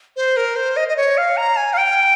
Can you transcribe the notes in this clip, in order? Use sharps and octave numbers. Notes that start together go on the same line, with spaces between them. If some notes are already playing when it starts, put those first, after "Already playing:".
C5
A#4
C5
D#5
D#5
C#5
F5
A#5
G#5
F5
G5